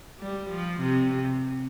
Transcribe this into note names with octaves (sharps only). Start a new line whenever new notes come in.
G3
F3
C3